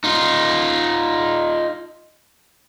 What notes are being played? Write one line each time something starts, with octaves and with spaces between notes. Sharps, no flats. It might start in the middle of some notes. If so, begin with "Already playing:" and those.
D#4 F4